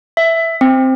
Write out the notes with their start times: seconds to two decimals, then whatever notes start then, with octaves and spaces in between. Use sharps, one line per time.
0.17 E5
0.61 C4